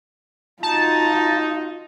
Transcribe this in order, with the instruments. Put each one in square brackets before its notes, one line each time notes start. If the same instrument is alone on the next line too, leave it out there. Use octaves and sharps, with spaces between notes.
[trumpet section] D#4 [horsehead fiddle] F4 F#4 [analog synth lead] A5